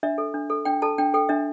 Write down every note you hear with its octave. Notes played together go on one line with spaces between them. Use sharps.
D4 E5
A4
D4
A4
D4 G5
A4 A5
D4 G5
A4 G5
D4 E5